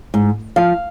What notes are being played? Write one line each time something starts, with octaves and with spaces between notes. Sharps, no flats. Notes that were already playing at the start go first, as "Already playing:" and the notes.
G#2
F3 F5